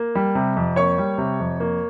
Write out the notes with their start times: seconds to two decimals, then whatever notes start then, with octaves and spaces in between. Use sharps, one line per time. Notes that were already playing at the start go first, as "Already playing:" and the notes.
Already playing: A#3
0.15 G3
0.35 C3
0.56 F2
0.76 A#3 C#5 C#6
0.98 G3
1.18 C3
1.40 F2
1.60 A#3